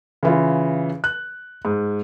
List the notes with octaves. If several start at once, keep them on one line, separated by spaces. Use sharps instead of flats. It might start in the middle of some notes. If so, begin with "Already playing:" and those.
C#3 E3 F4
F#6
G#2